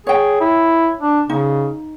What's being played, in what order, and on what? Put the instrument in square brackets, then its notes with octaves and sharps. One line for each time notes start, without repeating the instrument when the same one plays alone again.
[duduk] G#4 [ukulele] C#5 G5
[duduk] E4
D4
[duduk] C#3 [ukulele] D#4